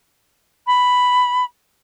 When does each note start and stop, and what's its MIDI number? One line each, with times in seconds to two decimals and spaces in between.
0.66 1.44 83